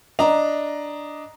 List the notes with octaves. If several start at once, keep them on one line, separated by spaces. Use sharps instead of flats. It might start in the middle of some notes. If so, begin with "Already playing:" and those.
D4 D#5 A#5